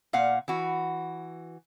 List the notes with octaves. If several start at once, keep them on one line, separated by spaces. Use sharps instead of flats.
A#2 F5 F#5
E3 F#4